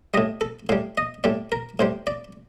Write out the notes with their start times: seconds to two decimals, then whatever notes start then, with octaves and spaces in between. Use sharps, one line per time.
0.14 A2 G3 D#5
0.41 A4
0.69 A2 G3 F5
0.98 D#5
1.24 A2 G3 D5
1.52 A#4
1.79 A2 G3 C5
2.07 D5